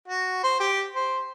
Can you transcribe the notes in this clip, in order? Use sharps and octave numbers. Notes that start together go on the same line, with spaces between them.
F#4
C5
G4
C5